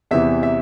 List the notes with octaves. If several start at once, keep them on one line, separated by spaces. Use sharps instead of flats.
E2 C3 E3 E5
E5